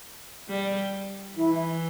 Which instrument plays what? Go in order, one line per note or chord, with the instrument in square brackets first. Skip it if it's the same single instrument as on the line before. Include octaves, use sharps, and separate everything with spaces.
[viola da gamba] G3
[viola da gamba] E3 [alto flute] E4